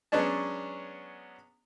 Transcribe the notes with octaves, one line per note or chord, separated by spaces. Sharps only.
F#3 G#3 B3 C#4 D4 A5